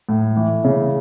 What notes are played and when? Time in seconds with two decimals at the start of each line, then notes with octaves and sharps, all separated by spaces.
0.09 A2
0.36 E3
0.64 C#3